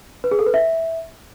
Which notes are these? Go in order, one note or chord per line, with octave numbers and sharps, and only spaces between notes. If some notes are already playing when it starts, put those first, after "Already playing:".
B4
G#4
A4
B4
E5